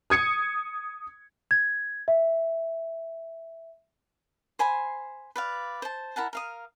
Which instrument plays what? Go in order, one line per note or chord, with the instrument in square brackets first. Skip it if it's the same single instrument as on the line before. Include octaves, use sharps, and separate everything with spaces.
[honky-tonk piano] D#6 G#6 C#7
[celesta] G#6
E5
[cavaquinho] C5 G#5 B5 C6
B4 D5 F5
C5 A5
E4 A#4 F#5 A5
A#4 F5 D#6